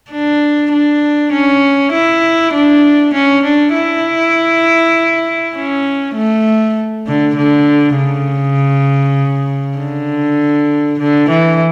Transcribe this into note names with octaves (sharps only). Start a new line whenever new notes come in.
D4
D4
C#4
E4
D4
C#4
D4
E4
C#4
A3
D3
D3
C#3
D3
D3
E3